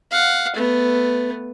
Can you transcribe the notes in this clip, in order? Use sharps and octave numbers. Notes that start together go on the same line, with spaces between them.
F5 F#5
A3 B3